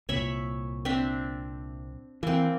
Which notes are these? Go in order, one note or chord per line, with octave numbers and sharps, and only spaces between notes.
C2 A#2 C#5 E5 B5
C4 D4 E5
E3 A#3 C4